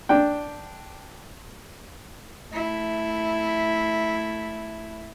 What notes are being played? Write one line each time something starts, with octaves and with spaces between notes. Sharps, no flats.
D4 G5
A3 E4